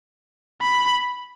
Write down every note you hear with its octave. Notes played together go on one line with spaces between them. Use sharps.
B5